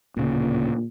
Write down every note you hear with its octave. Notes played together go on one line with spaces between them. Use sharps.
D1 A#2 C#3